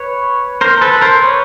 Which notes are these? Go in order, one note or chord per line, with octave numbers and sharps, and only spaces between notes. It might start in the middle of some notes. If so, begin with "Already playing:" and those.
Already playing: B4 C#5
A#4 C5
A4 B4
A#4 C5
B4 C#5